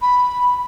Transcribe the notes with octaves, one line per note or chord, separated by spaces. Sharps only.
B5